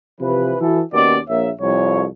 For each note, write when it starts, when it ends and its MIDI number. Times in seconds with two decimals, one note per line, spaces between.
0.21 0.56 48
0.21 0.56 52
0.21 0.56 53
0.21 0.56 71
0.61 0.80 52
0.61 0.80 66
0.61 0.80 69
0.93 1.17 39
0.93 1.17 47
0.93 1.17 51
0.93 1.17 61
0.93 1.17 73
0.93 1.17 74
1.30 1.50 34
1.30 1.50 58
1.30 1.50 73
1.30 1.50 76
1.62 2.04 36
1.62 2.04 41
1.62 2.04 73